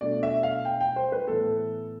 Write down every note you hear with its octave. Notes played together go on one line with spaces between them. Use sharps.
B2 A3 D4 D5
E5
F5
G5
G5
C5
B4
A2 E3 B3 A4